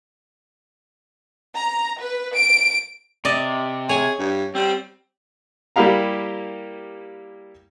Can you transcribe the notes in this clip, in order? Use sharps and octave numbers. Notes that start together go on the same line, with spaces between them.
A#5
B4
D7
C3 D5 D#5
G#4 C#5 G#5
G2
G3 C4
G3 A#3 E4 G4 F5 A#5